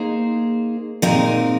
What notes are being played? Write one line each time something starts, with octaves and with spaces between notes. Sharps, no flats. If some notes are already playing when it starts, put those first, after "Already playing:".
Already playing: A#3 D#4 G#4 C5
A#2 G#3 C4 D#4 A#4